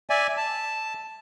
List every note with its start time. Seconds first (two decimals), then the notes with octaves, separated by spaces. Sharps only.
0.10 D5 E5 G#5
0.37 A5